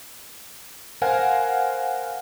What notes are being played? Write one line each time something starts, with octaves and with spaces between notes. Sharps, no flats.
A#4 C5 F5 F#5 G#5